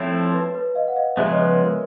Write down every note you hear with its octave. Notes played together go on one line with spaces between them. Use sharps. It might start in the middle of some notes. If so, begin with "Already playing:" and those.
Already playing: F3 A3 C4 E4 C#5
C5
B4
B4
D#5 F5
F#5
D#5 F5
C#3 F3 G#3 B3 D5 E5
C#5 D#5
B4
A#4